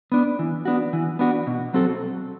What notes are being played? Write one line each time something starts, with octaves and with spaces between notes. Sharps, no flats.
B3 D4
E3
B3 D4 F#4
E3
B3 D4 F#4
B2
F#3 C4 F#4 A4